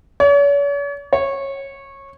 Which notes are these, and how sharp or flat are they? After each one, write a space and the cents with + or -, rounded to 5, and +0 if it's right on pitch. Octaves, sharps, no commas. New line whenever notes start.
C#5 +45
C#5 -15